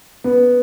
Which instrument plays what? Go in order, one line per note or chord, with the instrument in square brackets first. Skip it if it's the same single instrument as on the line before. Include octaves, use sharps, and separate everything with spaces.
[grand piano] B3